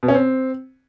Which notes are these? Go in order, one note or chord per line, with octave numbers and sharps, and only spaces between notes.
B2
C#4
C4